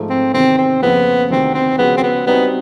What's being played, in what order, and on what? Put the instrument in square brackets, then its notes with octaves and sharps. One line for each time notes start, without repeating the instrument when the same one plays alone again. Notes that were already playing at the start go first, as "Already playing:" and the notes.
Already playing: [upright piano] G#2 F3 A3
[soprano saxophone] C4
[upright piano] E2 C3 D#3 [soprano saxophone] C4
[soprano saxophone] C4
[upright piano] F2 C#3 F3 A#3 [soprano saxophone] B3
[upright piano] D2 C3 D#3 [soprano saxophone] C4
[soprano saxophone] C4
[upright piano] C#3 F3 G#3 C#4 F#4 [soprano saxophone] B3
[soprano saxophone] C4
B3
[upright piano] G3 C4 D#4 F#4 [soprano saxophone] B3